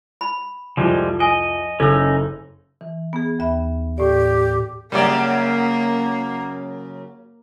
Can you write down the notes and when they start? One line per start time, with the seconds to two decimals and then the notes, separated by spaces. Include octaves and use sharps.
0.21 B5
0.77 C2 F2 F3 G3 G#3
1.20 D#5 G#5
1.80 F#1 C#4 D#4 A4 E6
2.81 E3
3.13 B3 G#4
3.39 D#2 E5 B5
3.98 A2 G4 D5
4.92 F#2 C#3 G3 A#3 D5